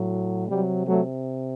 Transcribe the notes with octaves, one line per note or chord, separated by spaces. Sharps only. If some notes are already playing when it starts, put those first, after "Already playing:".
Already playing: A2 F#3
C3 F#3 G3
F#3 A3